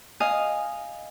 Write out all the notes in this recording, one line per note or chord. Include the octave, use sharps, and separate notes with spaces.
D#5 F5 G#5